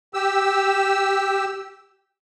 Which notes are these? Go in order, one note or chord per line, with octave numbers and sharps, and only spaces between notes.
G4 E6